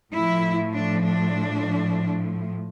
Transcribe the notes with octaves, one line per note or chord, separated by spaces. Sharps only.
A2 F3 E4
D4
D4